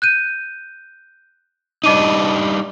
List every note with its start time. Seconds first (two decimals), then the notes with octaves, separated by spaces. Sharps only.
0.02 F#6 G6 D#7
1.84 G3 D4 D#4 D#5 D6 D#7